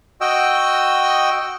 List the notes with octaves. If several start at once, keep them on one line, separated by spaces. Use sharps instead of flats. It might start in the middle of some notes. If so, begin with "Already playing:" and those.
F#4 D#5 G5 E6